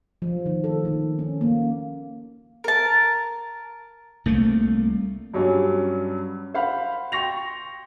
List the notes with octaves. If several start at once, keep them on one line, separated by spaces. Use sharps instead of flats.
F3
D#3
A4
D#3
C#4
A#3
A#4 A5
C2 A3 A#3
G2 F#3 G3 C#4
C5 F5 F#5 B5
G5 C6 C#6 A#6 F7